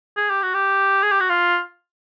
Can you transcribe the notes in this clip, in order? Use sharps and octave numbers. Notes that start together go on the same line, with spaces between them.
G#4
G4
F#4
G4
G#4
G4
F#4
F4